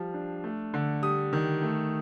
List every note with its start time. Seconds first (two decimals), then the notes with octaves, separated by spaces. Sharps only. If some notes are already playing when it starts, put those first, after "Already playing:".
Already playing: F3 G3
0.14 D4
0.44 A3
0.74 D3
1.03 G3 D#6
1.33 D#3
1.62 A3